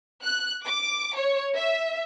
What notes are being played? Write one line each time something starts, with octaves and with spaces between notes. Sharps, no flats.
F#6
D6
C#5
E5